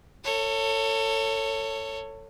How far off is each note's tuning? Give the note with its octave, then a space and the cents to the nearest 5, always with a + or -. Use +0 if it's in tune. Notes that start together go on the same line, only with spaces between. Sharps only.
A4 +30 C#5 +0